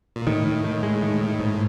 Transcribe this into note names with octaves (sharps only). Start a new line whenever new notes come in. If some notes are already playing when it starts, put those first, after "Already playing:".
A#2
A2 D#3
D#3
D#3
G#3
D#3
D#3
G#2